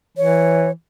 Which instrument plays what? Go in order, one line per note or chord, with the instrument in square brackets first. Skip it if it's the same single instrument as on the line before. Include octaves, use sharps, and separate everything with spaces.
[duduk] E3 [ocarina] C#5